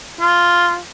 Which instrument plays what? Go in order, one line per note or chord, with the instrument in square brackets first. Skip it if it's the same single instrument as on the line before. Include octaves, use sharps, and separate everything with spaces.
[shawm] F4